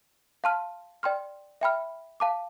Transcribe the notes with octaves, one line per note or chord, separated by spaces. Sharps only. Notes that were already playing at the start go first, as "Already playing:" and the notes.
F5 A5 C6 F6
D5 G5 C6 F6
E5 G5 B5 F6
F5 A5 D6